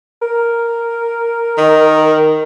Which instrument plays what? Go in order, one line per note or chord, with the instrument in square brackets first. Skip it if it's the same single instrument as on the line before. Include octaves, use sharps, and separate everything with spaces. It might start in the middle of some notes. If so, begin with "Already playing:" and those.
[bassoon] A#4
[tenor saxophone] D#3